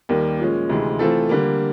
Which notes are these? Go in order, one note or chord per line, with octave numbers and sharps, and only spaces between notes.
D#2 D#3 G3 A#3
A#2 F3 G#3 C#4
D2 C3 E3 G#3
E3 A3 C4 F4 A4
D3 G3 A#3